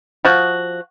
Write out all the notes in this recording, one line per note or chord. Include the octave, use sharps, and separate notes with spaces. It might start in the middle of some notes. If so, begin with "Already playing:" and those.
F3 F#4